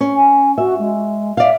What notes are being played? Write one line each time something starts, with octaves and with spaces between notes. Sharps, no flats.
C#4
G#5
F#4 E5
G#3
D5 E5 F5